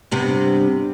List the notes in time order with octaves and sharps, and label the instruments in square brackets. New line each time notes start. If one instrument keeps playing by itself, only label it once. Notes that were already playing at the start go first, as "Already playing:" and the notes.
[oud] G2 C3 B3